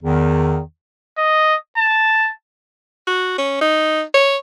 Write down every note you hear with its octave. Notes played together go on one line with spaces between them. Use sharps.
E2 D#3
D#5
A5
F#4
C#4
D#4
C#5